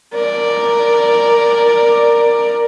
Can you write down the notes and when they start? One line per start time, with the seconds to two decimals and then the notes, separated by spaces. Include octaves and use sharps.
0.14 A#4 D5